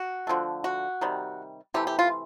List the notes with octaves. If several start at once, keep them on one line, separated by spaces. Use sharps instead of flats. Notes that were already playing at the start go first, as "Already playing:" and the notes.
Already playing: F#4
D3 F3 A3
F#4
C3 D#3 G3
C3 E3 A3 G4
G4
F4